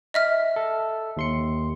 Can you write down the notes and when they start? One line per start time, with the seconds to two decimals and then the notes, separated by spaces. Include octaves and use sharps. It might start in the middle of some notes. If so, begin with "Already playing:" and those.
0.14 D#5 E5 F6
0.56 A4
1.17 D#2 C6 C#7